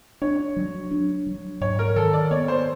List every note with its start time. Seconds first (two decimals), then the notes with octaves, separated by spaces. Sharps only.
0.22 D4 C#5
0.56 F#3
0.91 D4
1.26 F#3
1.61 G#2 C#5
1.79 A#4
1.96 D#3 A4
2.13 D5
2.31 B3 C#5
2.48 C5